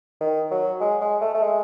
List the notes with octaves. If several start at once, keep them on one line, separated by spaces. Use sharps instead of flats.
D#3
F#3
G#3
G#3
A3
A3
G#3